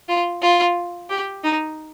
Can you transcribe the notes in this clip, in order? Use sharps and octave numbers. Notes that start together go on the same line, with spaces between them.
F4
F4
G4
D#4